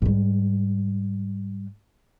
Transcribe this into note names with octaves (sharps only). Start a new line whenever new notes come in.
G#2 G3